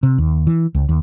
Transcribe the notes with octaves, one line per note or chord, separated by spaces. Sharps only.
C3
D#2
E3
C#2
D#2